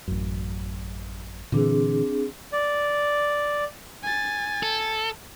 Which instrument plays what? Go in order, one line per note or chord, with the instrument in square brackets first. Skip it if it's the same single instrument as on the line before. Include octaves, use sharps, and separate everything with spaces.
[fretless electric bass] A1 F#2
[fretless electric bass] A#2 D3 E3 [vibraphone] C4 D4 G#4
[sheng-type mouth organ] D5
[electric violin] G#5 A6
[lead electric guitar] A4